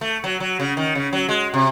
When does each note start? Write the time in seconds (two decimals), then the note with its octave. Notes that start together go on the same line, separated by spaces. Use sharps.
0.01 A3
0.24 F#3
0.40 F#3
0.60 C#3
0.77 D#3
0.95 C#3
1.13 F#3
1.29 G#3
1.54 C3